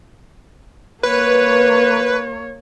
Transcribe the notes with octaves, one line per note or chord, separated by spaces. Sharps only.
A#3 B4 C#5